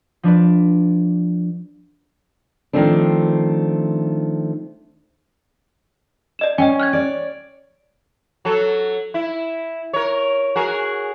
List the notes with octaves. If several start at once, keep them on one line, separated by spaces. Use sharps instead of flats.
F3 D4 B4 D5
D#3 F3 A3 C4 D4
D5 D#5 E7
C#4 D#5 G5 G#5
F6 F#6 G#6
C#5 D5
F#3 A4
E4
A#4 C#5
F#4 G#4 A#4